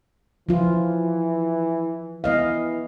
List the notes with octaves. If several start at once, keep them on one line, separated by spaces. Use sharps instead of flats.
E3 F3 F4
E3 B3 D#5 F5